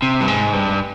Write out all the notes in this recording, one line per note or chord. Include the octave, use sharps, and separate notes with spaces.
C3
G2
G#2
G2